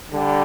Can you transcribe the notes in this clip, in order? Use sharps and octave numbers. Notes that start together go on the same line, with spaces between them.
D3 G3